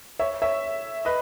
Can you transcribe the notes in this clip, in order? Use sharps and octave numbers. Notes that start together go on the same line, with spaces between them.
C#5 E5
C#5 E5
B4 D#5